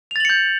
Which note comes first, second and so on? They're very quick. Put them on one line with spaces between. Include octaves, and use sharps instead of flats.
F7 A6 F#7 C#7 G6